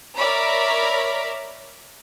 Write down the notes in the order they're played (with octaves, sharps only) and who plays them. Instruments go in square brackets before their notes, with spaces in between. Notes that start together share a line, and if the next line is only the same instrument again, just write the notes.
[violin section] A#4 C#5 D5 E5 A#5 B5